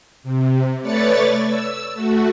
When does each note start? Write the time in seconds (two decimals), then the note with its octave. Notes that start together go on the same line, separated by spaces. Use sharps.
0.23 C3
0.82 A3 B4 C#5 D5 C#6 A6
1.46 E6
1.94 A3 F#4